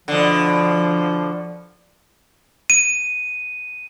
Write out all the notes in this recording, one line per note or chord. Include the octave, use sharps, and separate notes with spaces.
B2 D3 F3
D#7